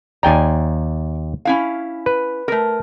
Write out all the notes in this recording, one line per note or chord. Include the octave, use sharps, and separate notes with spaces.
D#2 D5 G5 G#5 A#5
C#4 E4 F5
B4
A3 A#4